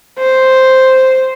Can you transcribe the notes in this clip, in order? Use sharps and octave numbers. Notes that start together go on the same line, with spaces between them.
C5